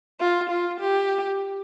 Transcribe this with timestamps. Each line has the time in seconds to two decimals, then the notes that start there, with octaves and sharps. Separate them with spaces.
0.20 F4
0.50 F4
0.80 G4